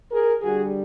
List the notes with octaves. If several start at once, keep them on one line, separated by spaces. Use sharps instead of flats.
G#4 A#4
D3 G3 F#4 G#4